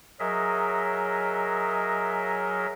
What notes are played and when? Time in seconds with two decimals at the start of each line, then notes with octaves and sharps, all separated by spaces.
0.20 F#3 G#4 A#4 D#5 E5